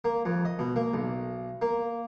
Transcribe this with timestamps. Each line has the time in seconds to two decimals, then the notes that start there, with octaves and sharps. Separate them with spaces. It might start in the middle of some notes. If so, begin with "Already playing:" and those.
0.05 A#3
0.25 F2
0.45 D#5
0.59 B2
0.76 A#3
0.94 B1
1.62 A#3